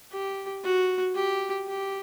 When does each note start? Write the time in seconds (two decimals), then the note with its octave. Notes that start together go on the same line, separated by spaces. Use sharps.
0.12 G4
0.64 F#4
1.15 G4
1.67 G4